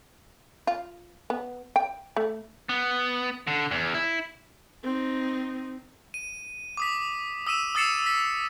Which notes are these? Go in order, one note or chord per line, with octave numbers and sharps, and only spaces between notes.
F4
B3
G5
A3
B3
D3
E2
E4
C4 D#4
D#7
D6 D#6 B6
D#6 E6 B6 D#7 E7
D#6 E6 A6 C7 C#7 E7
B6